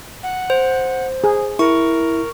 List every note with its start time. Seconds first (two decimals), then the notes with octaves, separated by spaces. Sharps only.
0.23 F#5
0.50 C5
1.24 G#4
1.59 E4 A#4 C#6